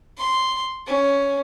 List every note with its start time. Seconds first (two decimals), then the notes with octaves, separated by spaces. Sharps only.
0.18 C6
0.87 C#4